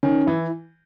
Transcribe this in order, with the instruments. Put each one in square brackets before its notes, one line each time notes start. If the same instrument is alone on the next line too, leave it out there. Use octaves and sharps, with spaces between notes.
[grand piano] D#3 [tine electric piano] C#4
[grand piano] E3 [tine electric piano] E4